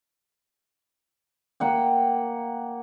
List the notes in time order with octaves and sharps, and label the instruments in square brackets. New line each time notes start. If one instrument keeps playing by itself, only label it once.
[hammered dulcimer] A#3 F#5 G5